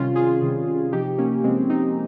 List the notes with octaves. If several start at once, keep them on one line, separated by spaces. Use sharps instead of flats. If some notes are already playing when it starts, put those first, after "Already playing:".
Already playing: C3 D#3 G3 C#4 F4
F4 G#4
C3 D#3 G3
C3 F3 D#4 G4
A#3 C#4
C3 F3 G#3 C4
C4 D#4